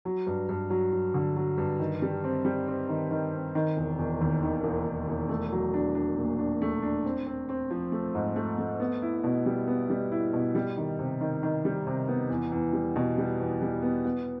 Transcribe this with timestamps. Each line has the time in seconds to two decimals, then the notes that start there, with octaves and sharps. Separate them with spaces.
0.05 F#3
0.27 G2
0.49 G2
0.70 F#3
0.92 F#3
1.14 D3
1.36 F#3
1.58 G2
1.79 D#3
2.02 G3
2.24 C4
2.45 G3
2.68 C4
2.89 D#3
3.11 D#3
3.33 C4
3.55 D#3
3.77 E1
3.99 E1
4.21 D#2
4.43 D#3
4.64 E1
4.85 E1
5.08 E1
5.29 A3
5.52 F#3
5.74 D4
5.95 D4
6.18 A#2
6.39 D4
6.62 A3
6.82 D4
7.05 C4
7.26 C4
7.49 C4
7.70 F3
7.92 A3
8.15 G#2
8.36 A3
8.59 A3
8.80 B3
9.02 E4
9.24 B2
9.46 G3
9.67 B3
9.90 G3
10.12 E4
10.33 B2
10.55 G3
10.77 D#3
10.99 C3
11.21 D#3
11.43 D#3
11.65 G3
11.87 C3
12.08 B3
12.29 E2
12.52 E2
12.73 G3
12.96 B2
13.18 G3
13.40 E2
13.62 G3
13.82 B3
14.05 B3